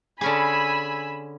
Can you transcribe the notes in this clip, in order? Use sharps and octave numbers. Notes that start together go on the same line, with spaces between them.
D3 C#4 G#4 G#5 B5 E6